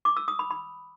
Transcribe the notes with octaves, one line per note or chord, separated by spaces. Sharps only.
D6
E6
D#6
B5
B5